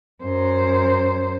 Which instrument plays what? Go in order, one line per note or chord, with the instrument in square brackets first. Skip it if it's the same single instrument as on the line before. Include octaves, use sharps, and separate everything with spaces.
[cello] F#2 C5